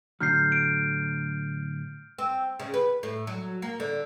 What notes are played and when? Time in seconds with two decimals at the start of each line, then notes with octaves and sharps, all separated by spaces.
0.20 A2 D3 F#3 F6 G6 C7
0.52 D7
2.18 C4
2.60 C#3
2.74 B4
3.03 A2
3.27 F#3
3.62 A#3
3.80 D3